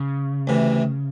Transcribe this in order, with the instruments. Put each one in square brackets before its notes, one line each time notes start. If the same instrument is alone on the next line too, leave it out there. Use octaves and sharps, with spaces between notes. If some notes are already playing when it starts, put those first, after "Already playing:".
Already playing: [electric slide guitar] C#3
[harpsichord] D2 C3 E3